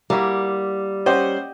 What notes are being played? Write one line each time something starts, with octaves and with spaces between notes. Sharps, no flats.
G3 A#3 E4 F#4
C#4 G4 C5 D#5 F#5